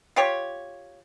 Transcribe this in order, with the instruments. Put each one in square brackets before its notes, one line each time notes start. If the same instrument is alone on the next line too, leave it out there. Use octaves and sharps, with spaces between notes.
[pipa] F4 G4 C#5